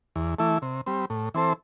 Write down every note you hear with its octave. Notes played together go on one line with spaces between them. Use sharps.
E2
E3 A3 E4
C3
G3 C4
A2
E3 C4 A4 C5